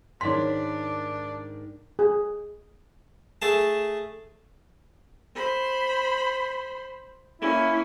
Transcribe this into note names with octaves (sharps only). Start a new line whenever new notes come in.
G#2 D#3 D4 A#4 C#5 C6 B6
G#4
A3 G#4 A5
C5 B5
A#3 C#4 E4